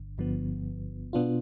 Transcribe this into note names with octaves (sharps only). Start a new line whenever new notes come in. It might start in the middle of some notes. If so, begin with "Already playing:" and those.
Already playing: G1 G2 D3
G1 G2 D3 F3 B3
B2 B3 D4 F4